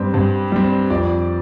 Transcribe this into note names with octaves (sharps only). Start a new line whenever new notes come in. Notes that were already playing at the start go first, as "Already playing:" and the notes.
Already playing: G2 G3 C4
G2
G3 C4
F2 D5